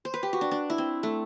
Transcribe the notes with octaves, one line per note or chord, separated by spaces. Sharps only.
C5
B4
G4
F#4
D4
D4
E4
C4
A3